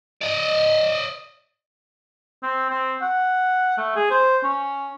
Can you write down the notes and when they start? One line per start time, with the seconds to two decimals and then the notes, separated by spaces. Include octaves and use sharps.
0.22 D5 D#5
2.43 C4
2.69 C4
3.02 F#5
3.78 A3
3.96 G#4
4.11 C5
4.44 C#4